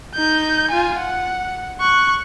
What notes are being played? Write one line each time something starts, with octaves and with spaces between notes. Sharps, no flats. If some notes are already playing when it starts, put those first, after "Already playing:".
D#4 G6
F4 G#5
F#5
C#6 F#6